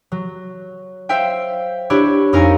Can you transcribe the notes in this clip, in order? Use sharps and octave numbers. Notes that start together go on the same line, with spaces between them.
F#3
C5 E5 F5 G5
D4 E4 G4 C#5
F2 D#4 A#4 F5 G#5 C#7